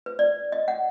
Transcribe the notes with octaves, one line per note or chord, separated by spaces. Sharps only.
B4
D5
D#5
F#5